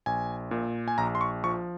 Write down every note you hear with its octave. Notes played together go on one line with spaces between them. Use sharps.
A#1 G#5
A#2
G#5
A#1 A#5
C6
C#6
F3 C#6